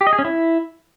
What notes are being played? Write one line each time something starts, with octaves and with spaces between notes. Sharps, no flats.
G4
D#5
G#4
C#4
E4